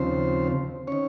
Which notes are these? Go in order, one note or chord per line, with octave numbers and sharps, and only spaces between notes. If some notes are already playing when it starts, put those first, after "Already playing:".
Already playing: D#2 C#3 F3 C4 C5
D#3 C#4 C#5